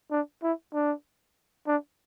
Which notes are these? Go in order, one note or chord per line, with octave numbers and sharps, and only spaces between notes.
D4
E4
D4
D4